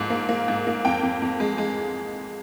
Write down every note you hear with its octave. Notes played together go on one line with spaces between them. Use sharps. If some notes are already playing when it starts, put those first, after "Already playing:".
Already playing: G#2 F3 A#3
A#3
A#3
G#2
A#3
F2 G5
F2
F2
G#3
G#3